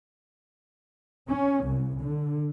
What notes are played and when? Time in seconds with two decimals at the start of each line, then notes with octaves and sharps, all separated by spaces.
1.29 C#4
1.65 C2
2.01 D3